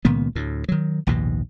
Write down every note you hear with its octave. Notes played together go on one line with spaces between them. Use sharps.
C#2 A#2 D#3 B3
D2 A2
D#3 F#3
A#1 D#2 G#2 B2